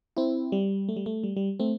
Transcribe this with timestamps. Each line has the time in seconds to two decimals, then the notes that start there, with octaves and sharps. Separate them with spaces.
0.17 C4 E4
0.52 G3
0.89 A3
0.97 G3
1.06 A3
1.23 G3
1.37 G3
1.60 A3 C4